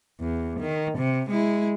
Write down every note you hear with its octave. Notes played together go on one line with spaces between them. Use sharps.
E2
D#3
C3
G#3 E4